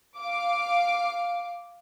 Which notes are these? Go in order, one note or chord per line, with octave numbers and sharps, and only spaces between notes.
F5 D6